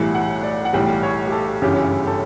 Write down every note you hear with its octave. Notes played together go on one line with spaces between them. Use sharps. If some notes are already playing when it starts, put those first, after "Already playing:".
Already playing: B1 A2 E3 G3 F#5
F#5
D5
F#5
B1 A2 E3 G3 G5
C#5
G4
A4
G1 F#2 C#3 E3 G4
A4